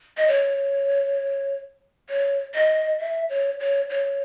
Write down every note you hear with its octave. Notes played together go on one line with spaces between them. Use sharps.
D#5
C#5
C#5
D#5
E5
C#5
C#5
C#5